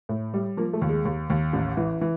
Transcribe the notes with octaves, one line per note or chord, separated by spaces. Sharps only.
A2
G3
F3 A#3
A3
D#2
G#3
D#2
D#2
A1
E3
E3